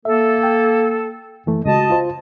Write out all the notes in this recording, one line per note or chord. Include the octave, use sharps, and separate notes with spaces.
A#3 A4 E5
G5
F#2 E3 A3
C#2 G#3 F#4 D#5 A5
F4 C5